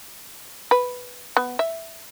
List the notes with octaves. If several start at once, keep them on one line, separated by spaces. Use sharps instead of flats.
B4
B3
E5